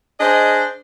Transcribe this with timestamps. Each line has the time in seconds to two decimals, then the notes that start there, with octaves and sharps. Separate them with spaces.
0.20 D4 G#4 C5 D#5